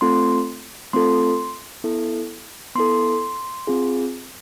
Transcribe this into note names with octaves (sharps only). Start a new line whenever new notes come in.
A3 C4 F4 A4 C6
A3 C4 F4 A4 C6
B3 E4 A4
B3 E4 A4 C6
C4 F4 G#4